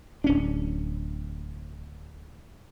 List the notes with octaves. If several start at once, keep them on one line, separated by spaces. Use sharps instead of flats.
D1 C#4 D4